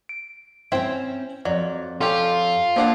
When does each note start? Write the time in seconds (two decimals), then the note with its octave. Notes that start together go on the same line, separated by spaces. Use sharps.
0.09 D7
0.72 C4 C#4 E4 C5 G5
1.45 F2 F#3 D5
2.01 C#4 F4 G4 A4
2.76 F3 A#3 D4 D5 F5 F#5